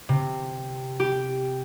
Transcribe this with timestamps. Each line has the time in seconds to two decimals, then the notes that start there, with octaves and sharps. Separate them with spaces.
0.09 C3
1.00 G4